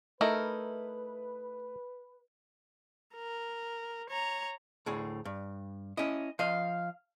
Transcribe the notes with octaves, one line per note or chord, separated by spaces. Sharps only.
A3 D#4 E4 A#4 B4
A#4
C#5 A#5
D2 A2 G#4
G2
C#4 E4 D#5
F3 D#5 F5